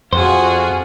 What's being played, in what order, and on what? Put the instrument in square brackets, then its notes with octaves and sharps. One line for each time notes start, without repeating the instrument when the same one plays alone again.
[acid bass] F2 [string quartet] F4 F#4 G#4 [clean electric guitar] C5